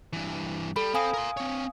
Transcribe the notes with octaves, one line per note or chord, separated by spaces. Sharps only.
G2 E3
G3 A4 B5
C4 F5 G#5 D#6
A#4 C6
C4 C#5